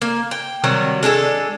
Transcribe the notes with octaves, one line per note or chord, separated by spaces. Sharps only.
A#3
G5
C3 D#3 F#3 G3
G#3 D4 G4 A4